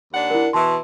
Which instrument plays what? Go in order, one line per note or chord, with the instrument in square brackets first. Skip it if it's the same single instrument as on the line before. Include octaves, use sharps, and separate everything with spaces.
[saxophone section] D#2 D4 F#5
[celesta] E4 A#4
[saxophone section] B2 E3 [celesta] A5 C6